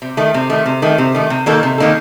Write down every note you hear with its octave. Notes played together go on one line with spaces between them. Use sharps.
C3
D#3 A3
C3
D#3 A3
C3
D#3 A3
C3
D#3 A3
C3
D#3 A#3 D#4 A4
C3
D#3 A#3 D#4 A4